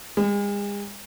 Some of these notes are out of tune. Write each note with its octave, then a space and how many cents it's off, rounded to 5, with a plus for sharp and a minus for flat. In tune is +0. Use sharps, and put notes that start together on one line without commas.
G#3 -40